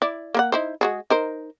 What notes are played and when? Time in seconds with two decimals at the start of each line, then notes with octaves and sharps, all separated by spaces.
0.02 E4 D5
0.34 A#3 A#4 F#5
0.52 D#4 E4 C5
0.81 G#3 F#4 G#4
1.10 D#4 A#4 C5